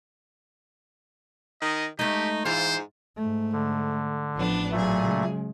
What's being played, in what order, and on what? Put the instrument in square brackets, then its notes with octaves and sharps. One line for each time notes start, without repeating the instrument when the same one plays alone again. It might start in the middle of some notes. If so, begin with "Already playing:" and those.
[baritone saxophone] D#3 [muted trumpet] D#5
[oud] G#3 A3 [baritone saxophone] D#4 [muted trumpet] G4
[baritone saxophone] G#2 [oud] E3 F4 F5 [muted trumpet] C5
[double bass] G#2 A3
[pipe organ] D3
[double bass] A1 [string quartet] F3 B3 D4
[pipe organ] A#2 A3 [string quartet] F#3 G#4
[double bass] C#3 G#3